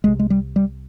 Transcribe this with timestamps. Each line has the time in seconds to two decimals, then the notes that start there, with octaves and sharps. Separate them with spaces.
0.04 C2 C3 G#3
0.19 G#3
0.30 G3
0.56 G3